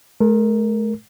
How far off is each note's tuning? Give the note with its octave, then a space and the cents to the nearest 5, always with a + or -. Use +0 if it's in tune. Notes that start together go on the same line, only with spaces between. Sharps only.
A3 -45 A#4 +0